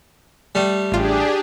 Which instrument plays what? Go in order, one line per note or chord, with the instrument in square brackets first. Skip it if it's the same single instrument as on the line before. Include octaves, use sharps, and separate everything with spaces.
[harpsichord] G3 A3
[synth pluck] A1 F4 [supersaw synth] D4 G4 G#4